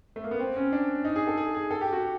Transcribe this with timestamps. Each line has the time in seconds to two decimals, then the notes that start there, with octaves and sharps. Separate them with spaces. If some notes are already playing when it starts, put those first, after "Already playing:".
0.16 A3
0.24 A#3
0.31 B3
0.40 C4
0.57 C#4
0.72 D4
1.05 D#4
1.16 G#4
1.27 A4
1.37 G#4
1.55 G#4
1.71 A4
1.81 G4
1.93 F#4